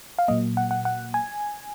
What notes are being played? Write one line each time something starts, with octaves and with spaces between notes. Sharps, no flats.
F5
A#2 F#3 A#3 D#5
F#5
F#5
F#5
G#5